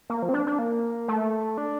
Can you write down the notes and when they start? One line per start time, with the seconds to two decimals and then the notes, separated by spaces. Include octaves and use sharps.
0.10 A#3
0.22 F3
0.29 C4
0.34 D4
0.47 D4
0.59 A#3
1.08 A3
1.58 D4